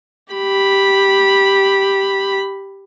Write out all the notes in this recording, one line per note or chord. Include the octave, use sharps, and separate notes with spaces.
G4 B5